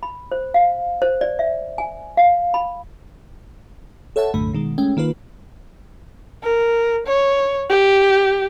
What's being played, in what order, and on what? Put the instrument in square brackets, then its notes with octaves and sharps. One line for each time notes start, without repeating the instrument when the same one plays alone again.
[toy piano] B5
C5
F5
C5
D5
E5
G#5
F5
B5
[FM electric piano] A4 C#5 E5 F#5 A5
B1 F#2 A2 D3 A3 B5
B2 D#3 G#3
G#3 A3 C#4 G5
D#3 A#3 F4 B4
[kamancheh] A#4
C#5
G4